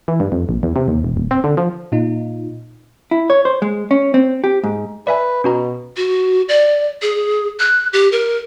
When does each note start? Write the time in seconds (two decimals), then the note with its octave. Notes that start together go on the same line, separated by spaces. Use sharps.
0.08 E3
0.20 G2
0.32 F2
0.49 A#1
0.63 E2
0.76 C3
0.88 D#2
1.04 E1
1.17 D#1
1.31 C4
1.44 D3
1.57 F3
1.92 A#2 D#4 F4
3.11 E4
3.30 C#5
3.45 C5
3.62 G#3
3.91 C#4
4.14 C4
4.44 G4
4.64 G#2
5.07 B4 D5 E5 G#5
5.44 B2 C#4 F#4 A#5
5.97 F#4
6.49 D5
7.02 G#4
7.60 F#6
7.93 G4
8.12 A#4